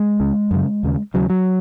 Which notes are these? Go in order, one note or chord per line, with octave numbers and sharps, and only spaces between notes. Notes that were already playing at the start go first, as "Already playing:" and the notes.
Already playing: G#3
C#2 C#3
F#2 C#3
D#2 C#3
D#2 C#3 F#3
F#3